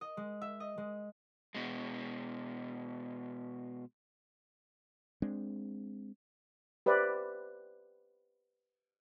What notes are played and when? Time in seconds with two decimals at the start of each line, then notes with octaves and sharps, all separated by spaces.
0.01 D#5
0.17 G#3
0.41 E5
0.60 D#5
0.78 G#3
1.55 B2 G#3
5.22 G#3 C4 D4
6.86 G4 B4 C5 D5 E5